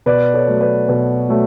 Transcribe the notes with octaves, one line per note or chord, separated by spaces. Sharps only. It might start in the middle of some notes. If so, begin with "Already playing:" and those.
B2 B4 D5
A4 C#5
F#3 A3
B4 D5
B2
F#3 A3